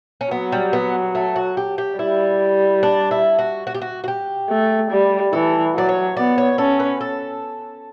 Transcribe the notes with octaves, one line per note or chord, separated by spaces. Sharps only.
C#4
F#3 B3
G3
B3
A3
F#4
G4
G4
G3 E4
D4
E4
F#4
F#4
G4
F#4
F#4
G4
A3
G3
E3 A4
F#3 D5
C#5
B3 D5
C#5
C#4 A4
B4
A4